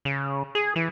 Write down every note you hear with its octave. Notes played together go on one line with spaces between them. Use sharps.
C#3
G#4
E3